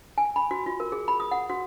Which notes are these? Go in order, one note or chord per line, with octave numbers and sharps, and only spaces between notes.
G#5
B5
F#4
F4
A#4
G#4
B5
D#6
F#5
F#4